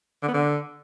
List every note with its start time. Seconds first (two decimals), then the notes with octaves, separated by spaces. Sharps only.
0.23 D3
0.28 B3
0.34 D3